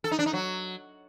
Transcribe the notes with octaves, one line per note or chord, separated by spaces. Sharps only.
A4
D#4
D4
D#4
F#3